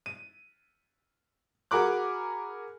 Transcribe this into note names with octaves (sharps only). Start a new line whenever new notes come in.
D#7
F#4 G#4 A#4 B5 D6 F#6